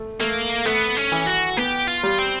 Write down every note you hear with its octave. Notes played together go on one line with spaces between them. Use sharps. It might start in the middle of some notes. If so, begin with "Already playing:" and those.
Already playing: A3
A3 A#3
A3 B3
C#4
E3
F#4
B3 G4
F4
G3
C4